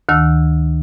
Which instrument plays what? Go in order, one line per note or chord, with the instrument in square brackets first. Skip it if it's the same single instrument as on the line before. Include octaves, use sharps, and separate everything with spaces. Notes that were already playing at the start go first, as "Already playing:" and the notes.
[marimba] D2 D#3 E6